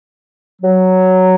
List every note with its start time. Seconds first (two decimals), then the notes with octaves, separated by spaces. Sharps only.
0.61 F#3